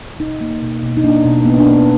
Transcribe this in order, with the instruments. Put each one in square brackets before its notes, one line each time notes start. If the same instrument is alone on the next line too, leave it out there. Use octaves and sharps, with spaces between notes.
[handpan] B2 D#4
A#3
B2
B2
D#4
A#3 D4
B2
A#3 B3
D4
B2 B3